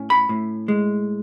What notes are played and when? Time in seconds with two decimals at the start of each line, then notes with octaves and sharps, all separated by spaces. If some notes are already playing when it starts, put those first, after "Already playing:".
Already playing: A2 C#4
0.10 B5
0.29 A2
0.68 G#3